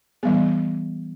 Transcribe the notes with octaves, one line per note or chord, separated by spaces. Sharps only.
E3 G3 B3 G#4